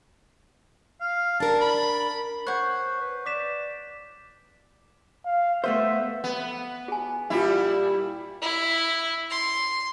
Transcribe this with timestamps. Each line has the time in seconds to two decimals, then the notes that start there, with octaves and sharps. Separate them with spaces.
1.01 F5
1.40 D4 A#4 A5
1.61 B5
2.47 C5 C#5 F#5 F#6 G6
3.01 B4
3.26 D5 D6 B6 E7
5.25 F5
5.64 A3 B3 C5 E5
6.24 B3
6.88 G#4 G#5
7.30 A#2 G3 E4 F4 B5
8.42 E4
9.30 C6